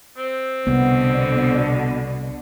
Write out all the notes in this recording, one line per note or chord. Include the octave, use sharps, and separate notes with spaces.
C4
C2 B2 D3 B3